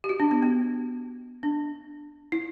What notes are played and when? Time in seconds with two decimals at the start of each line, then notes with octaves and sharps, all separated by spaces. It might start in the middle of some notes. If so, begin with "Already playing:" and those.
0.04 G4
0.09 F#4
0.20 D4
0.31 B3
0.43 B3
1.43 D4
2.32 E4